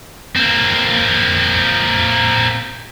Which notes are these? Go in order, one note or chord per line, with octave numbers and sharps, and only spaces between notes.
A#3 C4